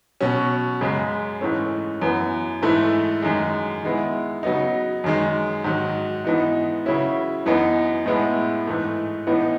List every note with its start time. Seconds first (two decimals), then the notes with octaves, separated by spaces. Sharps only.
0.21 B2 F#3 C#4
0.81 F#2 C#3 G#3
1.41 G#2 E3 A3 C#4
2.02 F#2 E3 B3
2.62 G#2 E3 A3 E4
3.22 F#2 D#3 G#3
3.83 D#3 G#3 B3 E4
4.43 C#3 F#3 B3 D#4
5.04 F#2 D#3 G#3
5.64 G#2 D#3 F#3
6.24 G#2 E3 B3 D#4
6.86 C#3 F#3 C#4 E4
7.46 F#2 E3 B3 D#4
8.06 A2 G#3 B3 E4
8.67 G#2 E3 A3
9.27 A2 E3 B3 D#4